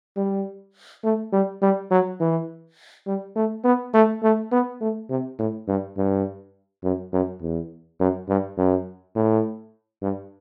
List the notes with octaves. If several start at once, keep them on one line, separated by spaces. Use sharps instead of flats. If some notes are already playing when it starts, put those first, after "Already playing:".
G3
A3
G3
G3
F#3
E3
G3
A3
B3
A3
A3
B3
A3
C3
A2
G2
G2
F#2
F#2
E2
F#2
G2
F#2
A2
G2